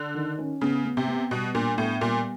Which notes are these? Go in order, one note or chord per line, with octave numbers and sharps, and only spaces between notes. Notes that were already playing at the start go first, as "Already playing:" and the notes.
Already playing: D3
D#3
C#4
C#3 B3
B3
C3
B3
B2 G3
A#2 D4
A2 B3
A#2 G3